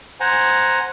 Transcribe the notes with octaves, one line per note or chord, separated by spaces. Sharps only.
C5 F#5 G#5 A#5